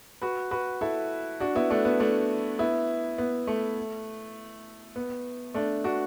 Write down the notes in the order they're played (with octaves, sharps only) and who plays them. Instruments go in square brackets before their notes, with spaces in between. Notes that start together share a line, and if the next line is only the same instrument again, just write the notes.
[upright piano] F#4 B4
F#4 B4
E4 A4
D4 F#4
B3 E4
A3 D4
B3
A3 D4
B3 E4
B3
A3
B3
A3 D4
D4 F#4